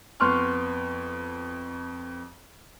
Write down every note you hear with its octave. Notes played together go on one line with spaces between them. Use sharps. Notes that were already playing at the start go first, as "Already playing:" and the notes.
F2 B3 C6 C#6 F6 F#6